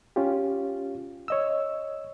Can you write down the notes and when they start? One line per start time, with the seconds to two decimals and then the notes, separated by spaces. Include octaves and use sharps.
0.16 C#4 F4 G4
1.28 C#5 D#5 E6